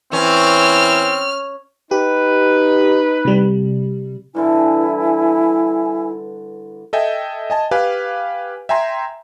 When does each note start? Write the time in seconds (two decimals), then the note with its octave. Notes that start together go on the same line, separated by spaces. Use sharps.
0.13 E3 C4 C#4 F6
1.91 D#4 G4 B4
3.25 C3 G3
4.35 G2 D3 E3 E4 G#5
6.93 A4 D#5 E5 G5 G#5
7.50 D#5 G#5 A5
7.71 G4 B4 F5 G#5
8.69 E5 G5 G#5 A#5 C6